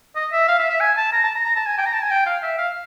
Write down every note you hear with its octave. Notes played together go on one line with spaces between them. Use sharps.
D#5
E5
F5
E5
E5
G#5
A5
A#5
A5
A#5
A#5
A5
G#5
G5
A#5
A5
G#5
G5
F5
E5
F5